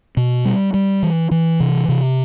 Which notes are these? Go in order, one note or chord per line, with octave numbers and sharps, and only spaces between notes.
B2
G3
G3
E3
E3
C3
C3